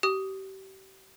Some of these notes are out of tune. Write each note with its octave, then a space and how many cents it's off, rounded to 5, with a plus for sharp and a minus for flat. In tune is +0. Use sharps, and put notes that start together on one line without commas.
G4 -35 D#6 +0